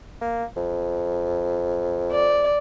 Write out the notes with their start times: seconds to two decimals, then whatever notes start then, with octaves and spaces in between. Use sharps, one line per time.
0.21 A#3
0.56 F2
2.12 D5